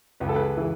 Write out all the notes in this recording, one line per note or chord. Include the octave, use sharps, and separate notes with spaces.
C#2 B4
A4
G#4 B4
E3